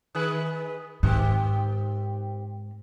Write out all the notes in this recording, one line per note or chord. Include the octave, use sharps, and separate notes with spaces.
D#3 G#4 B4
G#2 D#3 C4 G4